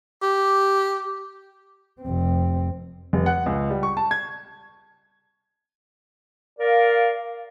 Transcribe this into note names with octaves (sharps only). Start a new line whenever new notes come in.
G4
F1 C4
F1
F#5
C#2
G3
C#6
A5
G#6
A#4 D5 F5